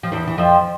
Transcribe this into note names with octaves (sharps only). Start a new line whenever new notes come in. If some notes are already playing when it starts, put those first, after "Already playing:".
F3
E2 E3
E3
F2 F3